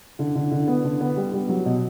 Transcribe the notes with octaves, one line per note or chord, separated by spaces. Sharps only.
D3
D3
D3
B3
D3
B3
G3
G3
F#3
B2